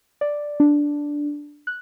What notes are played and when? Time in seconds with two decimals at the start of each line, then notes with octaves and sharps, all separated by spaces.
0.21 D5
0.60 D4
1.67 F#6